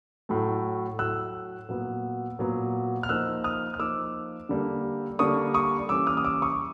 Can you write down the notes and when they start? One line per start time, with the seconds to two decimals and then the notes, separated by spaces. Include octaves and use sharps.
0.29 A2 F#3 A3
0.99 A2 F#3 A3 E6 F#6
1.69 A#2 F#3 B3
2.39 A#2 F#3 B3
3.03 F6
3.09 F3 A#3 D#4 E6 F#6
3.44 D#6 F6
3.74 F6
3.79 F3 A#3 D#4 D6 E6
4.49 D3 G3 A#3 D4
5.19 D3 G3 A#3 D4 C#6 D#6
5.54 C#6 D#6
5.89 E3 G3 A#3 C#4 D6 E6
6.07 D#6 F6
6.17 D#6
6.24 D6 E6
6.42 C#6 D#6